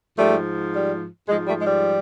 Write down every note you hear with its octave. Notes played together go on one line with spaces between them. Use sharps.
G#2 F3 G3 A3
G3
G#2 F3 G#3
G3 A3
G#3
G3